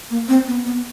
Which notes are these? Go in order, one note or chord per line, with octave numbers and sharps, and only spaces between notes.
A#3
C4
B3
B3